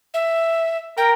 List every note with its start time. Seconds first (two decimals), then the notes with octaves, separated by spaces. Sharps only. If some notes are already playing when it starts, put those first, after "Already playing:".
0.14 E5
0.97 A#4 G5